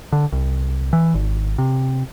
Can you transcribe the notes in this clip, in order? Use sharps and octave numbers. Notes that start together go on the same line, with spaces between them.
D3
C2
E3
G#1
C3